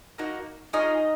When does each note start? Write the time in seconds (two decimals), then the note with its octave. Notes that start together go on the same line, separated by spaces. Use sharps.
0.18 A#3 D#4 F#4
0.73 C#4 D#4 F4 G#4 D#5